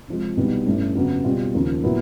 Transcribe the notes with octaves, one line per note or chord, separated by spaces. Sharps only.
C3 F3 G#3
C2 B2 G3 B3 D#4
A1 G2 E3 A3 C#4
F2 C#3 F#3 B3
B2 G3 C4 F4
D#2 C#3 F3
A#2 F#3 B3 E4